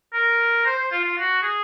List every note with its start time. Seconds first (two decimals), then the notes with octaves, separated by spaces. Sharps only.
0.14 A#4
0.66 C5
0.78 C5
0.92 F4
1.04 F4
1.17 F#4
1.43 G#4